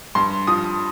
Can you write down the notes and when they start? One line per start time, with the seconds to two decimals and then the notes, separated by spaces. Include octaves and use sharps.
0.15 G2 C6
0.47 F3 D#6